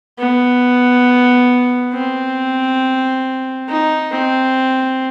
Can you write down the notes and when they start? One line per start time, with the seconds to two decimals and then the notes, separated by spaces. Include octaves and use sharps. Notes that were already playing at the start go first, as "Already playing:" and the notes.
0.19 B3
1.93 C4
3.69 D#4
4.12 C4